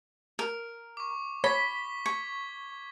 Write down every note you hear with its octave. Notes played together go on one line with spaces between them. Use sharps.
A#4
C#6 D6
C#5 B5 B6 G7
C#6 G#6